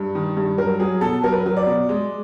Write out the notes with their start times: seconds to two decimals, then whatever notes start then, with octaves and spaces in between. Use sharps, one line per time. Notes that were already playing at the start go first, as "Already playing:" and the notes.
Already playing: G2
0.15 D#3
0.37 G2
0.58 F#3 A#4
0.80 F#3 G#4
1.01 B2 A4
1.23 F#3 A#4
1.32 B4
1.41 A#4
1.46 F#3
1.57 D5
1.66 B2
1.89 G#3